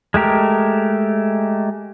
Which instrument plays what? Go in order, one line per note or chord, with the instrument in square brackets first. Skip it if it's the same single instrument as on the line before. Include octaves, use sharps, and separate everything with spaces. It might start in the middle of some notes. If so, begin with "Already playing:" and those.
[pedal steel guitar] G#3 A3 G4 A#4